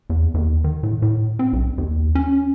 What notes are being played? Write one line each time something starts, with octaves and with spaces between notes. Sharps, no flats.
E2
D#2
D#3
A2
A2
C4
B1
D#2
C#4